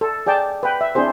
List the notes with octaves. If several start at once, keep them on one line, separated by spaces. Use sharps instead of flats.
A4
G#4 D5 G5 A5
B4 G5
E5
C4 D4 E4 G#4 C5